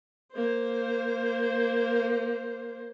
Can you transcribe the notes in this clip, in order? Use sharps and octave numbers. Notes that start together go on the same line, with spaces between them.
A#3 C5